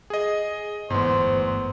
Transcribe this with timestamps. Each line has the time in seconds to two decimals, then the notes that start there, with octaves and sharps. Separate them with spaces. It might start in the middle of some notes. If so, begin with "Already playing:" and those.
0.10 G#4 D#5
0.90 G1 E2 G#2 A3 B3 C5